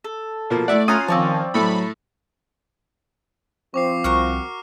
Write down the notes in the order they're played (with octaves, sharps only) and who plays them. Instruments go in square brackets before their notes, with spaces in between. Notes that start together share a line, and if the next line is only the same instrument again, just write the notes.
[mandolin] A4
[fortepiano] B2 F3 A#3
[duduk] A3 [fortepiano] E4 E5 F#5 [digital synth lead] D5
[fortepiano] C#4 G#5 A#5 [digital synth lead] F4 [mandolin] F#5 D#6
[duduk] D#3 [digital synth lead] F3 [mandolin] C4 C#5 D5
[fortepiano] A2 A3 A4 [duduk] F#3 [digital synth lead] B5
[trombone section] F3 C4 [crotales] C#6 D6 C7
[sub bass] C2 [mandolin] F#4 A#4 C#6 [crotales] F6